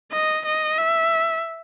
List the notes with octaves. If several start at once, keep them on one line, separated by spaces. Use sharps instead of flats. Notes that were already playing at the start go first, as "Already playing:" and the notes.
D#5
D#5
E5